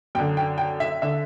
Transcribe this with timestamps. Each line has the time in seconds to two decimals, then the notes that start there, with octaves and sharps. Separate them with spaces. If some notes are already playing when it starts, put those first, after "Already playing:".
0.15 F#2 G5
0.19 D3
0.37 G5
0.58 G5
0.80 E5
1.02 D3 E5